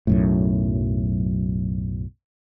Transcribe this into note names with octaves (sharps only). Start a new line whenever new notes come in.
B1 F#2 A2